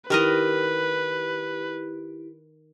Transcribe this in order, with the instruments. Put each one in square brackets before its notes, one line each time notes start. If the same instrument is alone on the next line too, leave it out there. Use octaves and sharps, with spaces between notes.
[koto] D#3 A#4 D#5 [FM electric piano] E4 G4 [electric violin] B4